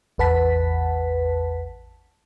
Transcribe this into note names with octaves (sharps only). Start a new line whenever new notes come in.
A1 E2 B4 F#5 A5 B6